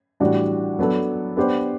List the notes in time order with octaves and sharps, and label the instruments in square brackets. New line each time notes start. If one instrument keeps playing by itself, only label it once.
[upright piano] A2 E3 G3 D4 F#4
F#3 B3 D4 A4
B3 D4 G4 C5